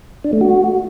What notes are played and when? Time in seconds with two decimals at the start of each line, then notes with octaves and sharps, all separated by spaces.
0.24 D4
0.33 A3
0.41 F#4